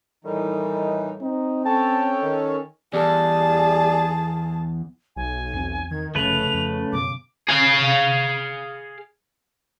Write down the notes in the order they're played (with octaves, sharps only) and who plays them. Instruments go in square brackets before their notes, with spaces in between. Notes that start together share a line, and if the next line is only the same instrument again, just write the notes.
[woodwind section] A2 D#3 G3 [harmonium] E3 D#4
[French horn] C4 [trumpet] D#4
[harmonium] C#4 A4 C#5 [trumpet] G5 [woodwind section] A5
[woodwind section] D#3
[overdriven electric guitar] E2 [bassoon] G3 [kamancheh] G#4 A5
[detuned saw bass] B1 [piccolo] G#5
[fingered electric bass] E2 C4
[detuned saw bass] D#3 [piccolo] G#6
[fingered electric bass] F1 F2 [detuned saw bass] C#3 [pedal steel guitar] A3 B4 [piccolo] F7
[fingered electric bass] F2
[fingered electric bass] F#2 B2 [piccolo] D6
[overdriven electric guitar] G#4 F5